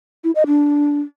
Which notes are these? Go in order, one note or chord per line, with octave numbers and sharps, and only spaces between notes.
E4
D#5
D4